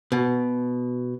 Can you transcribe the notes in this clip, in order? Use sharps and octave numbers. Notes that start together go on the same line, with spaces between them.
B2